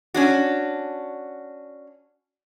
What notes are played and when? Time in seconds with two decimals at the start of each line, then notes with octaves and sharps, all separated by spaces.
0.14 C#4 D4 F#4